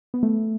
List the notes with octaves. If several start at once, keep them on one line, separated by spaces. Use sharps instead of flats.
B3
A3